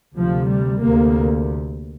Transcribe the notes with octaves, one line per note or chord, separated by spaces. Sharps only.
D2 C3 F3
G3
D2 C3 A#3